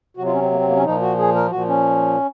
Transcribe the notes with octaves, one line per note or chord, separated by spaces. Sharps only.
C3 F#3 F#4
F4
C#4
C4
A#3
C4
A#3
C#4
A#2 F3 D#4
F#4
G#4
A#4
A#2 F3 F#4
C#4